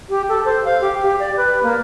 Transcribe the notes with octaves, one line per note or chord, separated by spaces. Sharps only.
G4
A4
C5
F5
G4
G4
D5
B4
A#3